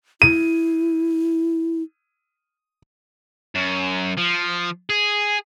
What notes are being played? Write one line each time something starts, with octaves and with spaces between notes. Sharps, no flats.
E4 D#7
F#2
F3
G#4